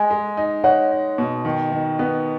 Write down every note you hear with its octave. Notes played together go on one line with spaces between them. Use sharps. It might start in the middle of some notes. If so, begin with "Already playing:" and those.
Already playing: G#3 D#5 G#5
G#3
D#4
D#4 C#5 F#5
D#4
B2
D#3
D#3
B3